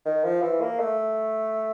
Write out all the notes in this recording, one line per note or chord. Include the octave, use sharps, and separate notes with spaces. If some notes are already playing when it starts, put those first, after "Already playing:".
D#3
F3
E3
A#3
A3